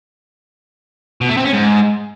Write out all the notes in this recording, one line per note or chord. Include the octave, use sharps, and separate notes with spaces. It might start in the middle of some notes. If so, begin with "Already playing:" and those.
B2
A3
C4
C#4
G#2